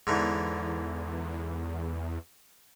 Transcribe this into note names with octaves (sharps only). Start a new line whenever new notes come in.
E2 G#2 D3 E3